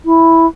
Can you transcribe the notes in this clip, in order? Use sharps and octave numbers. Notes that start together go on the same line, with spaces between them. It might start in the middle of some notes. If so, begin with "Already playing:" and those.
E4